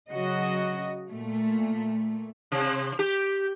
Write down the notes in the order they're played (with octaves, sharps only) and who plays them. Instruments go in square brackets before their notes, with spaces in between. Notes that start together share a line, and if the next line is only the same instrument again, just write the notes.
[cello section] C#3 F#3 F#4 D#5
A#2 A3
[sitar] C3
G4